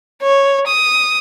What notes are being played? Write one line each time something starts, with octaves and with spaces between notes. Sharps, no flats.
C#5
D#6